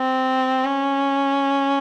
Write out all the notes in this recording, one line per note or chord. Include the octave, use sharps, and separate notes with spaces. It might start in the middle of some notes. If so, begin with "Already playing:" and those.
Already playing: C4
C#4